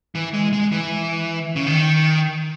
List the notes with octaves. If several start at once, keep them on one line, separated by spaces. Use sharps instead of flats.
E3
G#3
G#3
E3
C#3
D#3